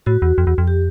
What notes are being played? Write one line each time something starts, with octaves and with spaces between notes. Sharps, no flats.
A2 F#4
E2
F2
E2
F2
G4